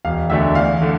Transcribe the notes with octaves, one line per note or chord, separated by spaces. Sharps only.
E1 F5
D2 D3 A3 D4 E5
E2 F5
D3 A3